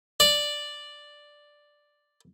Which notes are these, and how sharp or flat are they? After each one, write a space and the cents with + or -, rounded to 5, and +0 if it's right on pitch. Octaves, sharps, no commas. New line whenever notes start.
D5 +5